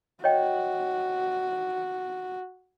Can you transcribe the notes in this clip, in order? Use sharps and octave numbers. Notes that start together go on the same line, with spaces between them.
F#4 C#5 D#5 G5